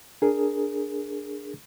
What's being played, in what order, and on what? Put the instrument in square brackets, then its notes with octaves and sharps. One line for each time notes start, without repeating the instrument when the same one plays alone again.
[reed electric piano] D4 G#4 A#4